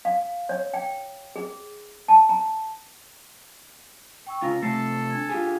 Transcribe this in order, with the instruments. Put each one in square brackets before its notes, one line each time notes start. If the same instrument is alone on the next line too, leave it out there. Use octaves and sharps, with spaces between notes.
[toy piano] F5
C#5
G5
G#4
A5
A#5
[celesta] G5 C#6 E6
[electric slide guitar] C#3 F4 [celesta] A#5 E6 A#6
[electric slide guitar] C3 A3 [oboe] A4 [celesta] C7
[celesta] D4 G#6
[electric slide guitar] F4 G4 G#4